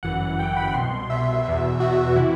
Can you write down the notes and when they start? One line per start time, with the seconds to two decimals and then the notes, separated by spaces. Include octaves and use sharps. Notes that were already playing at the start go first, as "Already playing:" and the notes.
0.03 G1 F#2 E3 F#5
0.39 G1 F#2 E3 G5
0.57 B5
0.74 C2 B2 C6
1.10 C2 B2 E5
1.45 E2 B2
1.80 E2 B2 F#4
2.16 C3 E3 E4